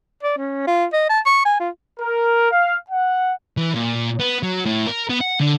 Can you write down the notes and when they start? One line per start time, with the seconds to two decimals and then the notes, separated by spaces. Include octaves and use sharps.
0.23 D5
0.37 C#4
0.67 F4
0.93 D#5
1.09 A5
1.26 C#6
1.45 G#5
1.60 F4
1.98 A#4
2.51 F5
2.90 F#5
3.57 E3
3.75 A#2
4.20 B3
4.43 F#3
4.65 A2
4.87 A#4
5.09 B3
5.21 F#5
5.40 D3